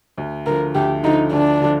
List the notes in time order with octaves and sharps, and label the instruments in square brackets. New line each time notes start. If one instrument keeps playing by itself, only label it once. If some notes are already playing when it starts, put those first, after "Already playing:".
[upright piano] D2
[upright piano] D3 F3 [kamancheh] A#4
[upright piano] D2 [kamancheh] G4
[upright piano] D3 F3 [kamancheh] D#4
[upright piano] D2 [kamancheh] D4
[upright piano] D3 F3